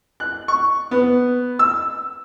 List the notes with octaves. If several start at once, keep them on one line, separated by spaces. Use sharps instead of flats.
F#6
C#6
B3
E6